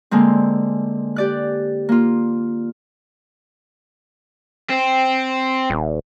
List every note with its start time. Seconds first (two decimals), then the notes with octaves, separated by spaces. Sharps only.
0.11 D3 G#3 A#3 C4
1.16 G4 D5 F#6
1.89 A#3 F4
4.70 C4
5.70 D#1